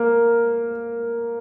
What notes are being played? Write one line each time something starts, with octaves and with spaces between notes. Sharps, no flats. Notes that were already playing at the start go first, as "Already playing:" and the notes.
Already playing: A#3